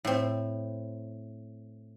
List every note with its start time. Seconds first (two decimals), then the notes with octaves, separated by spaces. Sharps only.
0.05 A2 C4